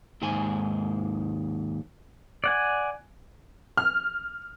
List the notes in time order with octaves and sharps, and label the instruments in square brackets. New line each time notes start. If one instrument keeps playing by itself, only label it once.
[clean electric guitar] D#2 G#2 G#3 C5 G#5
[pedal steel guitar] D5 F#5 G#5
[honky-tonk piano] F6